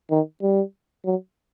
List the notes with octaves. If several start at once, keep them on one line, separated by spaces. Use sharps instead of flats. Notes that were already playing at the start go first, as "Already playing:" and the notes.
D#3
G3
F#3